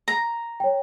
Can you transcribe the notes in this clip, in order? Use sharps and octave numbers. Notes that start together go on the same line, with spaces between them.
A#5
C#5 G5